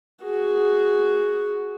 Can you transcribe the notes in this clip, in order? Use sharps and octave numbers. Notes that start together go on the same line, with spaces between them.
F#4 G#4